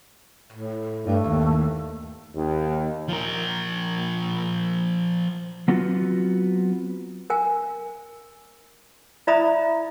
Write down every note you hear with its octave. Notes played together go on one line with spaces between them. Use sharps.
A2
G2 A3
D#2
D#2
F3 A#4
F#3 B3 C4 F4 F#4
A#4 G#5
E4 D5 E5 A#5 B5 D#6